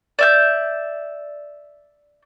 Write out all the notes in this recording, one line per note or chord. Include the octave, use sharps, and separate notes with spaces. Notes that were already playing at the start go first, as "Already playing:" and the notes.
D5 E5 G6